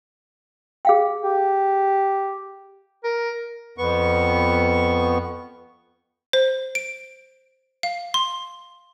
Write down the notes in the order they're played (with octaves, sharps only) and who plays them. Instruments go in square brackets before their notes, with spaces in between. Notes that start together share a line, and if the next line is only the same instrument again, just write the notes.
[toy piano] G#4 F5 G5
[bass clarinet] G4
[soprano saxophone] A#4
[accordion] F2 B3 C#6
[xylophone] C5
D7
F5
C6